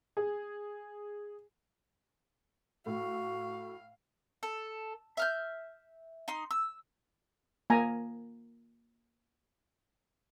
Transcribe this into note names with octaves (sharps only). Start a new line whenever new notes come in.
G#4
A2 A3 F#4 F5
A4
E5 F6 G6
D#4 C6
E6
A#3 G#5 A#5